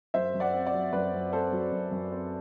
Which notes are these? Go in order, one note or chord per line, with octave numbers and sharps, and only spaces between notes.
F#2 C5 E5
F#2
D5 F#5
C4
D5 F#5
F#3
F#2 B4 D5
F#2
C4 A4 C5
F#3
F#2
F#2
C4